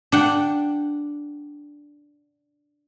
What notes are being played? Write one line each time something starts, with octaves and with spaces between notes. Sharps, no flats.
D4 F#5 G5